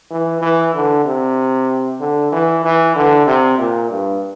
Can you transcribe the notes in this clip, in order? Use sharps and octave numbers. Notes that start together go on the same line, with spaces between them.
E3
E3
D3
C3
D3
E3
E3
D3
C3
A#2
G2